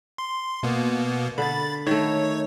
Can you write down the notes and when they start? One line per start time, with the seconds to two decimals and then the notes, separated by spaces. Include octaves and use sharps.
0.18 C6
0.63 B2 A#3 B3
1.38 D3 B5 A6
1.87 D#3 A3 C#5